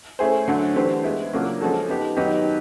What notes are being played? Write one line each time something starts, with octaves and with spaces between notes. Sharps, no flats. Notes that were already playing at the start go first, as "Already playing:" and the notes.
A3 C#4 E4 G#4 C5
D3 F#3 A3
E3 A3 D4 G4 C5
G#3 B3 E4
C#3 F#3 A#3 D4 F4
F3 G#3 C#4 F#4 A4
B3 D#4 G4
D#3 F#3 B3 D#4 G4